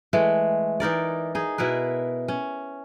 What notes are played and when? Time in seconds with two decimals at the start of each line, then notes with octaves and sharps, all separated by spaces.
0.13 E3 G#3 A3
0.80 E3 D#4 A#4 D5
1.35 D#4 G#4
1.58 B2 E4 A#4 B4
2.28 C#4